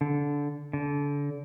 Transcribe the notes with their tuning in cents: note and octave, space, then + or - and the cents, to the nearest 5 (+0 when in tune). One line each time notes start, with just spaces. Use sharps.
D3 -20
D3 -30